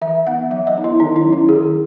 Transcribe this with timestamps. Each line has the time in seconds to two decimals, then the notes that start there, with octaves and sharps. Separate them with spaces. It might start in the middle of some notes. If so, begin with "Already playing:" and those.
0.02 E3 E5
0.27 B3 D#4 F#5
0.50 F#3 E5
0.67 D#5
0.76 B3 D#4
0.84 E4
1.00 D#3 D#4
1.16 E4
1.25 F#3 C#4
1.33 E4
1.49 D#3 G#4